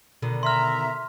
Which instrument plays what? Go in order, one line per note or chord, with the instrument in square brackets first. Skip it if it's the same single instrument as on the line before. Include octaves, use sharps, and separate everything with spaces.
[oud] B2 D3 D#3
[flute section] E5 A#5 [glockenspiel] C6 F6